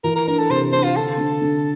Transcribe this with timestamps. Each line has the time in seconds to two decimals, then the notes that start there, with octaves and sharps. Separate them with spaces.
0.04 E3 A#4
0.16 A#4
0.27 D4 A#4
0.39 A4
0.50 C3 C5
0.72 D4 C5
0.84 F4
0.96 D3 A4
1.18 D3
1.42 D3